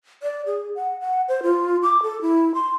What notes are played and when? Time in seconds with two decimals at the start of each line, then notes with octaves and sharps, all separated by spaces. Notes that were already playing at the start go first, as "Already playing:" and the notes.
0.23 D5
0.46 G#4
0.76 F#5
1.00 F#5
1.28 C5
1.43 F4
1.83 D6
2.03 A4
2.22 E4
2.54 C6